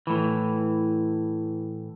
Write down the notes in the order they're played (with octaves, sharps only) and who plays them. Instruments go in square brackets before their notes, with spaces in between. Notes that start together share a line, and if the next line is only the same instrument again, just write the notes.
[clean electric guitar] A2 E3